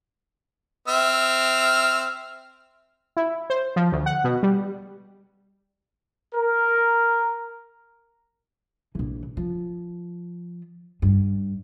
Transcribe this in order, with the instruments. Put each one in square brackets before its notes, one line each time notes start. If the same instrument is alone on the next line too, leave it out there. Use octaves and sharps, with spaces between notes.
[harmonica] C4 E5 F6
[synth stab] E4
C5
F3
D2
F#5
B2
G3
[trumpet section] A#4
[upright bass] A#1 E3
F3
G2